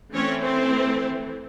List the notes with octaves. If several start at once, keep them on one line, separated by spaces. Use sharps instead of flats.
E3 A3 C4 C#4 C#5
C4 C5